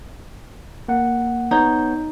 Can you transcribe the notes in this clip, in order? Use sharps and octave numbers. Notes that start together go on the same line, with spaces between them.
A#3 F#5
B3 D#4 C#5 G6